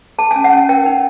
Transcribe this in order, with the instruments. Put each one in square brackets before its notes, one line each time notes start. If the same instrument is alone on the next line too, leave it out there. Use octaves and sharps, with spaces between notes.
[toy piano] G#4 A5
G#5
C#4
F#5
C#4
A#4 G5
D#4